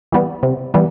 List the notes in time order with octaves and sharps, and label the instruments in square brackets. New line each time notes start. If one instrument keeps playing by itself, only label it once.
[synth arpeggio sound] E3 G3 B3
C3
E3 G3 B3